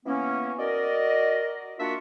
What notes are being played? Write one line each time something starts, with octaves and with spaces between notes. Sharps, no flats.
E3 A#3 B3 C#4
F#4 A#4 D5 D#5
A#3 D4 F4 F#4 E5 F#5